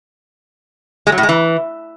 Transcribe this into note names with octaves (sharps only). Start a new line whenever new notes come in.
G#3
F#3
A2
G#3
E3